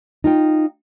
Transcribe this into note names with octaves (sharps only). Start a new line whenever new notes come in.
D#4 F4 G5